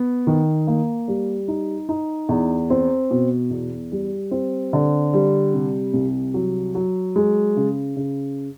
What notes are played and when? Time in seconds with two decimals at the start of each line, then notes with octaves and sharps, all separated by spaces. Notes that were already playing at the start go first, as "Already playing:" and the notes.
Already playing: B3
0.27 D#3
0.67 A#3
1.08 G3
1.48 D#4
1.89 D#4
2.29 E2
2.70 C4
3.11 B2
3.50 E2
3.92 G3
4.31 C4
4.73 D3
5.14 G3
5.54 C3
5.94 C2
6.34 F#3
6.75 F#3
7.16 G#3
7.57 C#3
7.96 C#3